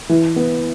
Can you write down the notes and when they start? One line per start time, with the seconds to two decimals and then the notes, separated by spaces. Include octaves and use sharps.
0.09 E3
0.36 B3